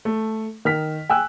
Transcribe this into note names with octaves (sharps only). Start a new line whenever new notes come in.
A3
D#3 F6 B6
G5 G#5 E6 F#6